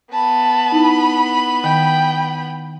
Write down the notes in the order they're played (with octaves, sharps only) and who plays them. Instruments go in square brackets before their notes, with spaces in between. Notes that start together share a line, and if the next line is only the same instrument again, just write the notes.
[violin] B3 B5 [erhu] A5
[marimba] D#4 E4
[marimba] D#3 [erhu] G5